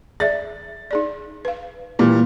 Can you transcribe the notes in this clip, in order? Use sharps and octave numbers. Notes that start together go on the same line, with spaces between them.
G#4 D5 E5 A6
D#4 G#4 D5
B4 F5
A#2 E3 G3